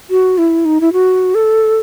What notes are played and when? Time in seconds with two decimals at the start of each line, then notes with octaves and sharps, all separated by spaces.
0.10 F#4
0.38 E4
0.65 D#4
0.81 E4
0.93 F#4
1.35 A4